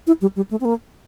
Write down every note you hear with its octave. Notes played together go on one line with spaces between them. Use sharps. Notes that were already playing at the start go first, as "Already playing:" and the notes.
E4
G3
G3
A3
C4
A#3